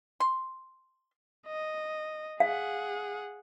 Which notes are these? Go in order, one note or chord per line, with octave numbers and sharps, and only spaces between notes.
C6
D#5
G#4 F5 F#5